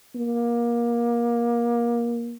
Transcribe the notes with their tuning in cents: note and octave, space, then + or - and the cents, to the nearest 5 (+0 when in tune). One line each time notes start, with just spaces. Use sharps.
A#3 +25